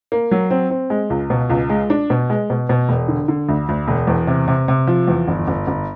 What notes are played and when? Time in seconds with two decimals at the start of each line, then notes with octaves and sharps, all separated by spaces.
0.12 A#3
0.31 F#3
0.50 C4
0.70 C4
0.90 G#3
1.10 C#2
1.30 B2
1.50 C#2
1.69 G#3
1.90 D4
2.10 B2
2.30 G#3
2.50 B2
2.69 B2
2.89 E1
3.08 D3
3.28 D3
3.49 D2
3.69 D2
3.88 E1
4.07 E2
4.27 C3
4.48 C3
4.68 C3
4.87 F3
5.08 E2
5.28 G1
5.47 G1
5.67 G1